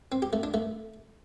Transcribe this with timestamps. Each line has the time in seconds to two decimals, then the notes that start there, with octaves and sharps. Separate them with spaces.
0.12 C4
0.22 G4
0.33 A3
0.43 D4
0.54 A3